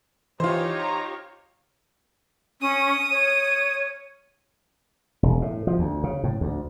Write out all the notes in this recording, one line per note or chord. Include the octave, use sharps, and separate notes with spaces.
E3 D#4 F4 G4 C5 C#5
A#5
C#4 D#6
C#5
E1
A2
F3
D2
C#3
A2
D2